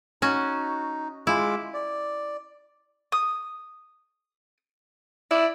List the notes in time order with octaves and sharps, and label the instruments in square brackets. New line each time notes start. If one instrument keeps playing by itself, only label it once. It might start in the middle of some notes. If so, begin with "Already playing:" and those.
[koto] C#4 F#4 [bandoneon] D#4
[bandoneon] G#3 F4 D6 [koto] E4
[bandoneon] D5
[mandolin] D#6
[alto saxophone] E4 [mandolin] D5